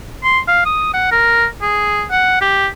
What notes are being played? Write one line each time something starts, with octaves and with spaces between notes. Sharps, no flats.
C6
F5
D#6
F#5
A#4
G#4
F#5
G4